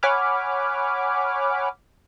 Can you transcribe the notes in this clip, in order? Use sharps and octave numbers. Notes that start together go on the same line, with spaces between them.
C#5 F#5 G#5 B5 D6 F6